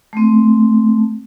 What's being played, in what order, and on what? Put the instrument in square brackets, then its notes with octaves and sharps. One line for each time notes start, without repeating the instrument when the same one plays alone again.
[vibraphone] A3 C4